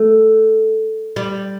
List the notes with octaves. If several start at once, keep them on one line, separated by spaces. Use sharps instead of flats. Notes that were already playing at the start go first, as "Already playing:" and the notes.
Already playing: A3
G3